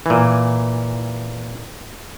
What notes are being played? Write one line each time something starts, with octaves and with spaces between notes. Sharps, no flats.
A#2 E3